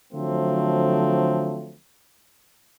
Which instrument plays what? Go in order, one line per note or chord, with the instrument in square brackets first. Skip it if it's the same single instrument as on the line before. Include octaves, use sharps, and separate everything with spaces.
[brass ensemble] D3 F3 F#3 A3 C4